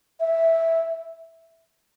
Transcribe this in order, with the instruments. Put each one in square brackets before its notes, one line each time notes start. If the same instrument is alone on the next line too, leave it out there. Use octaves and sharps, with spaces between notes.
[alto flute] E5